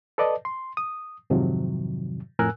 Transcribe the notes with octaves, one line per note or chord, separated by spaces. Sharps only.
A4 B4 D5 D#5 A5
C6
D#6
F2 G#2 C3 D#3 F3 F#3
F2 A2 A#4 G#5 E6 F#6